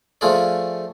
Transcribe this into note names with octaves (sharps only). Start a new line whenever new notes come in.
F3 A3 F4 G#4 D5